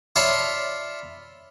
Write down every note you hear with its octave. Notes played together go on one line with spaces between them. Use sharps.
F4 C#5 D5 E5 A5 B5